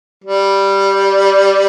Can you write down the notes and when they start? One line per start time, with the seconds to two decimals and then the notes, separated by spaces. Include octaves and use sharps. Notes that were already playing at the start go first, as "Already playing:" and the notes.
0.24 G3